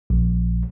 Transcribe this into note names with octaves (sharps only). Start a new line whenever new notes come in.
A#1